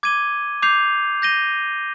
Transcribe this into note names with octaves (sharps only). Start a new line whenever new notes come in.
D6 G#6 D#7 G7
D6 G6 C7 F7
G6 A#6 D#7 G7